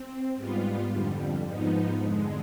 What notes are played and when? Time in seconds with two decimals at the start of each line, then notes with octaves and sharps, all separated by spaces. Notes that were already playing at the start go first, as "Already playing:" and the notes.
Already playing: C4
0.36 G#2 G3 B3 F4
0.91 F2 D3 G3
1.46 G#2 F3 B3 D#4
2.01 F2 D3 G#3